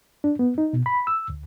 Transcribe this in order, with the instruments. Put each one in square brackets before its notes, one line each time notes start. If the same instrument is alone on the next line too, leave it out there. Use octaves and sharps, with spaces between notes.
[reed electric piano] D4
B3
D#4
B2
B5
E6
D2